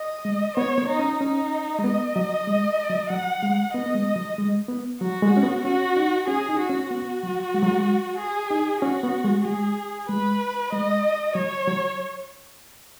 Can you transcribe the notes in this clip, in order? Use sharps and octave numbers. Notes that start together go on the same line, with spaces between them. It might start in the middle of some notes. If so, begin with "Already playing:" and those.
Already playing: D#5
G#3
B3 C#5
B3
D#4
C#4
C#4 D#4
G#3
B3 D#5
F#3
G#3
F#3
F#3 F#5
G#3
B3 D#5
B3
G#3
F#3
G#3
B3
F#3 F#4
G#3
C#4
B3
C#4 F#4
D#4
C#4 G#4
D#4
F#4
C#4
B3 F#4
F#3
G#3
F#3
G#3
G#4
D#4
C#4 F#4
B3
G#3
G#3 G#4
G#3 B4
G#3 D#5
F#3 C#5
F#3